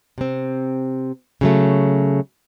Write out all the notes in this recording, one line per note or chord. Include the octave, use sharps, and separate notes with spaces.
C3 C4
C#3 F#3 A3